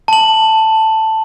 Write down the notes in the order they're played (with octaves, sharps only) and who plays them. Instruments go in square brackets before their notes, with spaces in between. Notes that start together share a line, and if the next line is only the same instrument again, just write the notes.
[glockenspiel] A5 F#7